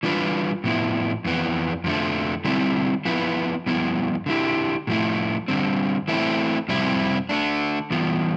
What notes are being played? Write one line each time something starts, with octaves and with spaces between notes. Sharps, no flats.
E3 G3 D4 F4 B4
A2 F3 B3 E4
F2 E3 B3
F2 D3 F3 A3
D3 G3 C4 E4
F3 B3 E4 B4
G2 F3 B3 E4
D3 A3 E4 G4
A2 F3 A3 E4
G2 D3 G3 C4
E3 A3 C4 E4
F2 C3 G3 C4 E4
D3 A3 D4
G2 E3 B3 F4